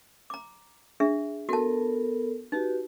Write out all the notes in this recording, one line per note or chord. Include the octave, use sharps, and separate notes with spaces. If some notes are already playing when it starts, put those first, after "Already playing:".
A#5 D6
D4 G#4 E5
B3 F#4 A4 A#4 A5
D#4 F#4 G4 B4